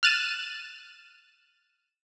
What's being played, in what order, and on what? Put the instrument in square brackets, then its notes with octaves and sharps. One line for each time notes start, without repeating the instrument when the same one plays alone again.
[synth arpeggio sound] F6 F#6 A6 D#7 E7